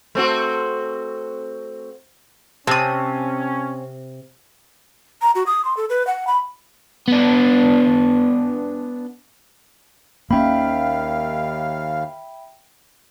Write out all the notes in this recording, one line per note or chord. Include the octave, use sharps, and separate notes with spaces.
A3 C4 F#4
C3 C4 C#4 A5 D#6 E6 A6
A#5
F#4
D#6
C6
A4
B4
F#5
B5
B3 D4
D#2 A#3 C#4 E5 F5 G5 B5